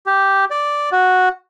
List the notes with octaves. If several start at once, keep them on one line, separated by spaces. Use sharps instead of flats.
G4
D5
F#4